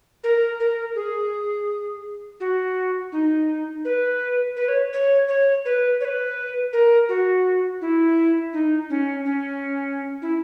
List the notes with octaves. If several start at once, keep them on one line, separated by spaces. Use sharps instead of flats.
A#4
A#4
G#4
F#4
D#4
B4
B4
C#5
C#5
C#5
B4
C#5
B4
A#4
F#4
E4
D#4
C#4
C#4
E4